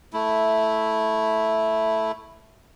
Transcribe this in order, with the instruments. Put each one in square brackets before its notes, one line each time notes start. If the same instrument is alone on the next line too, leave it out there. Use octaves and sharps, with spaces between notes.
[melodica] A3 E4